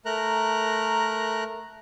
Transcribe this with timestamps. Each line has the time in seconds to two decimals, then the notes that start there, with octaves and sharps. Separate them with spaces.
0.06 A3 A#4 A#5 F#6